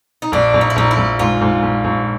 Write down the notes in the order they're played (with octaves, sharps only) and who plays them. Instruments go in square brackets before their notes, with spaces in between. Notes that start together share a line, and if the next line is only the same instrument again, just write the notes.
[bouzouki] D#4
[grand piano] A#1 [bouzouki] D4
[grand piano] A#1
[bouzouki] D#4
E4
[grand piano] A#1 [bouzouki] D#4
[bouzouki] E4
[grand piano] A#1
[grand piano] G#2 [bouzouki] F4
[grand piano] G#2
A#1
A#1